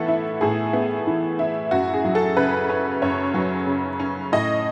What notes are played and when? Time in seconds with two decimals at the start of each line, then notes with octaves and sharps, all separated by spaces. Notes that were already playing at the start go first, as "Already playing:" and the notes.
Already playing: A2 E3 B3 A4 E5 F#5
0.08 E4
0.41 A2 G#4
0.73 B3
1.07 E3
1.39 E4
1.71 F#2 F#4
1.94 G#4
2.05 F#3
2.15 A4
2.37 C#3 B4
2.69 C#4
3.02 F#2 C#5
3.34 F#3
3.67 C#3
3.99 C#4
4.32 A2 D#5